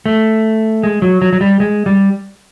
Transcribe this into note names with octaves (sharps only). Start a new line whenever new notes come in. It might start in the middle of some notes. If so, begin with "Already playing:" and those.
A3
G#3
F#3
F#3
F#3
G3
G#3
G3